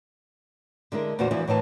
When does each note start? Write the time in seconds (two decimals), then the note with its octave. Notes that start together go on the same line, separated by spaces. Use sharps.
0.92 D3 G#3 E4 A#4
1.19 E2 A#2 D3 F4 F#4 C5
1.31 E2 E3 F3 D4 E4
1.48 A2 D#3 E3 A5